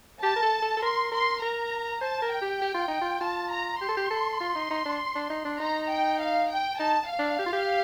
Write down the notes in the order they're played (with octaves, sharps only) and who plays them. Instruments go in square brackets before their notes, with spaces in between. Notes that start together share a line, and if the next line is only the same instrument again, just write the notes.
[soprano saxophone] G4 [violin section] A5
[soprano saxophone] A#4
A4
A4
A4
[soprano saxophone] A#4 [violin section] C6
[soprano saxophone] A#4 [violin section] C6
[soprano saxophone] A#4 [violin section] A#5
[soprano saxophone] C5 [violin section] A5
[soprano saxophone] A#4
[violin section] G5
[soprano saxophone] G4
G4
F4
D#4
F4
[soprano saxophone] F4 [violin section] A5
[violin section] A#5
[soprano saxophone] G4 [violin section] C6
[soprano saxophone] A4
G4
A4
F4
D#4
D#4
D4
D4
D#4
D4
[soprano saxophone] D#4 [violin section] A#5
[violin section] G5
F5
G5
[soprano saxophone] D#4 [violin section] A5
[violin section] F5
[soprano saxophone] D4
G4
F4
G4